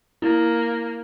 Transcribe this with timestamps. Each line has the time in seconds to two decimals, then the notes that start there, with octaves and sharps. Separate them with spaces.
0.22 A#3 E4